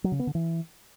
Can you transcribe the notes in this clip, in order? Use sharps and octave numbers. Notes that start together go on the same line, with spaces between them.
F#3
C#3
B3
D3
E3